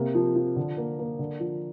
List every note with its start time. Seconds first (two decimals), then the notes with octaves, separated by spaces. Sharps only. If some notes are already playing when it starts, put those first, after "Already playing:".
Already playing: C3 A#3
0.15 F3
0.36 F3
0.56 D3
0.77 A#3
0.99 A#3
1.19 D3
1.40 F3